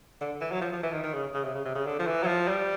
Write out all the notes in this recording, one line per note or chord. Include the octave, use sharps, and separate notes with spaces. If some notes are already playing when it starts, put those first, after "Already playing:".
D3
E3
F#3
F3
F3
E3
D#3
D#3
C#3
C#3
C3
C#3
C3
C#3
D3
F3
E3
F#3
F3
G3